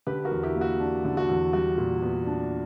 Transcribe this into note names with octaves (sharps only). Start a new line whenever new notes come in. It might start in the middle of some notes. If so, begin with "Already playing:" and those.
D3 G4 B4
F#4 A#4
E2
E4 G4
A#3
F#4
D4
D3
F#4
E2
G3 F#4
A#2
B3
D4